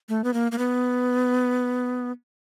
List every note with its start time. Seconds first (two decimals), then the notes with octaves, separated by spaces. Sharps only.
0.09 A3
0.24 B3
0.34 A#3
0.52 A#3
0.58 B3